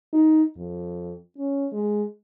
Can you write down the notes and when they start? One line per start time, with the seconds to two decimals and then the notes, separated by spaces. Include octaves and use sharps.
0.13 D#4
0.57 F2
1.38 C#4
1.73 G#3